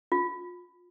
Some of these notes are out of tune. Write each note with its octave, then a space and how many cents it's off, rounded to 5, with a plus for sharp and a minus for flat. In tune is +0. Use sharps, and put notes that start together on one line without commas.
F4 +20